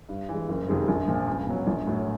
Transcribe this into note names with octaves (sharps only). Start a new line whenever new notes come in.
G2
E3 G#3
F#1
F2 C3 D#3 G#3
A#1
A#2 F3
C#2
B2 F#3
A#1
A2 F#3